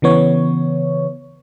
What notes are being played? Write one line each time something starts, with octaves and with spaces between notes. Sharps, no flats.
C#3 E3 B3 C#5